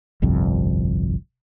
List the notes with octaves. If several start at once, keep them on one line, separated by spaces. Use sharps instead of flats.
G1 C2 F2